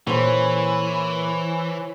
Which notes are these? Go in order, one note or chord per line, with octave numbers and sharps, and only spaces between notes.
A#2 E3 C5 C#5